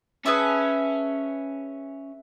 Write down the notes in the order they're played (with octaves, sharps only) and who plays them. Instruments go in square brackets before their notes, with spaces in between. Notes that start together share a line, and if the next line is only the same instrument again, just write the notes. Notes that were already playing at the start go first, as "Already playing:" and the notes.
[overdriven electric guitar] C#4 [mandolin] G#4 B4 E5 A5